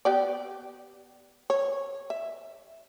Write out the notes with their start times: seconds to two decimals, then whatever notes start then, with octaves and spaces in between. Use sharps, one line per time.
0.05 B3 G4 D5
1.50 C#5
2.10 E5